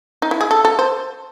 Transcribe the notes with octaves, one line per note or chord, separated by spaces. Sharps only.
D#4
E4
G#4
A4
A4
C5